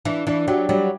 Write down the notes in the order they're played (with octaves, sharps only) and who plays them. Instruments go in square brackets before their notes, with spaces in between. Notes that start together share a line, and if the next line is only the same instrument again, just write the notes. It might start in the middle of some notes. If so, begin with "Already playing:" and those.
[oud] E3 [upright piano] D4
[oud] E3 [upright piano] D4
[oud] F#3 [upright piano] G4
[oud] F#3 [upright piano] G3